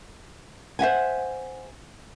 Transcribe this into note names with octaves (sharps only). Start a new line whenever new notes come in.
C5 E5 F#5 G#5